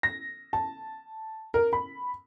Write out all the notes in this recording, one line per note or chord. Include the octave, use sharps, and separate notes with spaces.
A#6
A5
A#4
B5